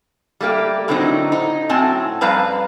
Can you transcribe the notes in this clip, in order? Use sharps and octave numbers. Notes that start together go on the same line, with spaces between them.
G3 A3 A#3 G4
A2 D3 F#3 C4 D#4
D#4
A2 F#3 C4 G#5 A5
F2 G3 B4 F5 A5 A#5